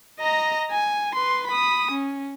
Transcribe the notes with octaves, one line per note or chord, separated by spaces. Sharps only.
D#5 A#5
G#5
B4 C6
B5 D#6
C#4